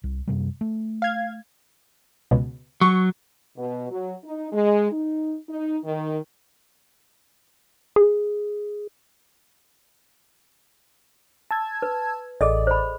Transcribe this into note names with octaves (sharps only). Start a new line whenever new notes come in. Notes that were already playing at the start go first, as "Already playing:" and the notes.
C2
F#2 C3 G3
A3
F5 G#6
C#2 B2
F#3 C#6
B2
F#3
D#4
G#3
D#4
D#4
D#3
G#4
A5 E6 G#6
B4
A1 G#4 A4 D5 D#5
C5 B5